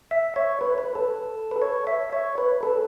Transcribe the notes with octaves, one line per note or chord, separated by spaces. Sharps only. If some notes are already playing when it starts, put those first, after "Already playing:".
E5
C#5
B4
B4
A4
B4
C#5
E5
C#5
B4
A4